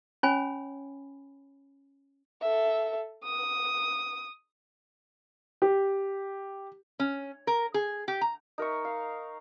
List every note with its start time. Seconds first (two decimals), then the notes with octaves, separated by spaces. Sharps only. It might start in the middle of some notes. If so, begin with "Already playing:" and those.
0.23 C#4 C#5 G#5 B5
2.42 A4 E5
3.24 D#6
5.62 G4
7.00 C#4
7.47 A#4
7.74 G#4
8.08 G4
8.21 A#5
8.58 D#4 A#4 E5 C#6
8.85 F5